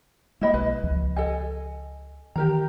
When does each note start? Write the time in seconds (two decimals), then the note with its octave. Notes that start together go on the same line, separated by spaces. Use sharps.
0.41 G#3 A#3 E4 D#5 B5
0.54 B1 B4
0.83 C#2 F3
1.16 A4 D#5 G#5
2.36 D#3 E3 G4 A#4 A#5